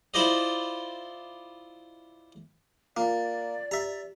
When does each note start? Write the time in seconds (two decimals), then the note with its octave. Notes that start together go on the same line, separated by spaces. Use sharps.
0.14 E4 F4 C5 D5 D#5
2.97 A#3 F4 D5
3.71 G4 E5 A#5